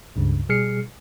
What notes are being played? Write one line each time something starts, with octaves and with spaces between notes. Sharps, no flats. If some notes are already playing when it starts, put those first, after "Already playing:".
C#2 G2 C#3
B2 G3 G#4 F6 C7 C#7